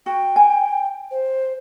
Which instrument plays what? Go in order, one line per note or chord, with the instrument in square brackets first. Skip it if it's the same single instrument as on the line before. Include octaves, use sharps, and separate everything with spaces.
[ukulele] F#4 [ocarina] G5
[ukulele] G#5
[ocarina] C5